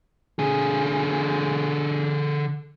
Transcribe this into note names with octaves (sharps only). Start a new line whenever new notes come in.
D3 G#4